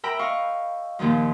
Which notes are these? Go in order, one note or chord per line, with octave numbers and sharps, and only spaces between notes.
A#4 E5 G5 A#5 B5
D#5 F5 C#6
D#2 A#2 D#3 F3